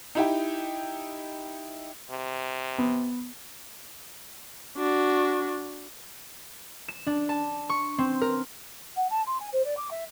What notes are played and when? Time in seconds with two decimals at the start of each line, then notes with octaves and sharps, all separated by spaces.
0.15 D#4 E4 G4
2.11 C3
2.78 B3
4.78 D4 F#4
6.88 E7
7.07 D4
7.29 A5
7.69 C#6
7.98 C4
8.21 A#4
8.96 F#5
9.10 A5
9.27 C6
9.40 G#5
9.53 C5
9.65 D5
9.77 D6
9.91 E5